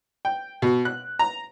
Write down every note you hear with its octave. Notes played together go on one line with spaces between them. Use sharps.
G5
B2
F#6
A#5